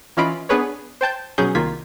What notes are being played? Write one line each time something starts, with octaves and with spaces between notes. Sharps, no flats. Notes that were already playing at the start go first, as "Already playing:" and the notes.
E3 C#4 F4 D#5 B5 D7
B3 D4 G#4 B4 C#5
C5 G5 A5 G6
B2 F#3 C#4 G#4 G6
C2 D#3 A#3 F4 G#6 B6